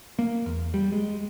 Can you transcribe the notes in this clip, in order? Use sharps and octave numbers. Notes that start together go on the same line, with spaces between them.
A#3
E2
G3
G#3